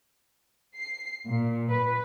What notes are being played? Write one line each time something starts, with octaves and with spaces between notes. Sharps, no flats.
C7
A#2
B4